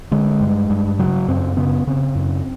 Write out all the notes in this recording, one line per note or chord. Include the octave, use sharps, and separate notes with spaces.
D3 G#3
G2
G2
C#3 F#3
F#2 C4
C#3 B3
C#3 C4
F#2